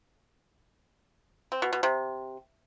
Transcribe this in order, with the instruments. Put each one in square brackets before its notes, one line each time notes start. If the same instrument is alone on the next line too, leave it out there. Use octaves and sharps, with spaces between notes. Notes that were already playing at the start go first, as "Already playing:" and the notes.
[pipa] C4
B2
B2
C3